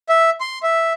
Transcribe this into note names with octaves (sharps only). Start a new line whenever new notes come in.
E5
C6
E5